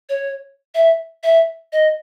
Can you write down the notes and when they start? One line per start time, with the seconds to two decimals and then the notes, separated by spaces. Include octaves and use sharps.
0.09 C#5
0.75 E5
1.23 E5
1.72 D#5